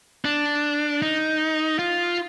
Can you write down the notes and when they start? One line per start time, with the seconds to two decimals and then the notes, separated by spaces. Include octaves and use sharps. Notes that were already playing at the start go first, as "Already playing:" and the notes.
0.25 D4
1.02 D#4
1.79 F4